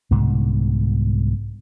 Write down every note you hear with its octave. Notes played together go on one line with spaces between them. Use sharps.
C2 G#2 B2 D3